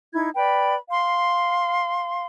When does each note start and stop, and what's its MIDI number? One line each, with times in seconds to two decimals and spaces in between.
0.12 0.30 63
0.12 0.30 64
0.12 0.30 92
0.35 0.75 71
0.35 0.75 74
0.35 0.75 79
0.35 0.75 83
0.88 2.25 77
0.88 2.25 84